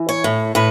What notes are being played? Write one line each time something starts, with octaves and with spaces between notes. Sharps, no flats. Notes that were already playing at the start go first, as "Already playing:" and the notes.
Already playing: E3
C#5
A2
A2 B4